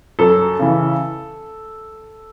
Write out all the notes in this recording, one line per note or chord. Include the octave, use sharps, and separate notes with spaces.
F#2 A4
C#3 E3